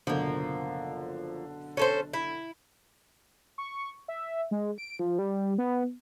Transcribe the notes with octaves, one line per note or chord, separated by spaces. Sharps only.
F#1 B2 D3 F3 A#3
C#4 A4 C5
E4
C#6
E5
G#3
D7
F3
G3
B3